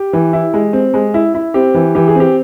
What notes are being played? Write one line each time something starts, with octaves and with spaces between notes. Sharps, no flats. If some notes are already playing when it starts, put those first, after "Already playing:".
Already playing: G4
E3
E4
G#3
C4
G#3
E4
E4
C4 G4
E3
E3 G4
G#4
C4 G4